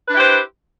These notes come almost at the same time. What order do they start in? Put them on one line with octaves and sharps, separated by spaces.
B4 D4 E4 G4 C5